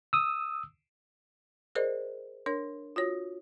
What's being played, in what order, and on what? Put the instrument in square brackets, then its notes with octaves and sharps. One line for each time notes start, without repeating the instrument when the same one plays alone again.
[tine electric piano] D#6 E6
[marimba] G#4 A#4 C5 D5 D#5
D4 A#4 C#5
F4 F#4 C#5